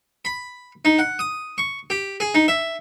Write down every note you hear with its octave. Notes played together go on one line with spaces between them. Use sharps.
B5
D#4
F#5
D#6
C#6
G4
G#4
D#4
E5